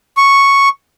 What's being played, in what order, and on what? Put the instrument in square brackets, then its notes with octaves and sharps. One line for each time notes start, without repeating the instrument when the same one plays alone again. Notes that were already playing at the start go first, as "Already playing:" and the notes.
[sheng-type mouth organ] C#6